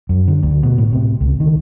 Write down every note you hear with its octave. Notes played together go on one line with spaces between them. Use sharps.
F#2
D3
D2
B2
A2
C3
C#2
D#3